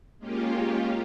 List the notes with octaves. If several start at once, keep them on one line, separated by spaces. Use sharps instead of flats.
G#3 A#3 C#4 F4 G4